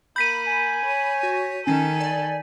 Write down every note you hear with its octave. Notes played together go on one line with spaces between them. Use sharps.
A#3 B5 G6 B6 D#7
G#5
C#5
F#4
D#3 C#4 A4 G#5
D5